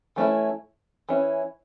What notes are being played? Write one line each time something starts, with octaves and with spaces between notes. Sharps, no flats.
E3 A3 C#4 E4
E3 C#4 E4